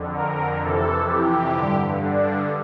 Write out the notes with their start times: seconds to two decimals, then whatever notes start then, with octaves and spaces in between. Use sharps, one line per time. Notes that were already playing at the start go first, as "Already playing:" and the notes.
Already playing: F2 D3
0.16 A#4
0.63 F2 C3 E3 A4
1.09 G4
1.57 G2 D3
2.03 D4